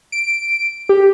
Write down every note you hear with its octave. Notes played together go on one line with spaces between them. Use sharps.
D7
G4